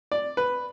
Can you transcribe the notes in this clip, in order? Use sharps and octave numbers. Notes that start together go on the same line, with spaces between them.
D5
B4